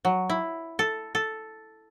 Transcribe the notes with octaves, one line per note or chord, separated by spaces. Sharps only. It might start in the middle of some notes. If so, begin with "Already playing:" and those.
F#3
E4
A4
A4